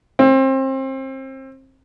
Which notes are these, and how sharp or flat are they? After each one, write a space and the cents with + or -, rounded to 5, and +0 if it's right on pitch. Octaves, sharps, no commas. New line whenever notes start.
C4 +30